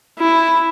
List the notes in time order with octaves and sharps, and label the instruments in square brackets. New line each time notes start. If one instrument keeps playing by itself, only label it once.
[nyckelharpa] E4